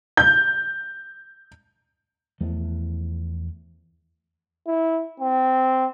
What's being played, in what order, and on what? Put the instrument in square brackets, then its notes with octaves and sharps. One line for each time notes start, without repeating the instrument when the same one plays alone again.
[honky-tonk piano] G6
[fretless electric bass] E2 F3 A3
[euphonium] E4
C4